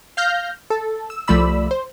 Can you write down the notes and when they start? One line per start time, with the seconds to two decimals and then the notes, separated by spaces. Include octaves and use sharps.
0.17 F5 F6 G6 A#6
0.70 A4
1.10 E6
1.28 C2 F3 A3 D5 B5 E6
1.71 C5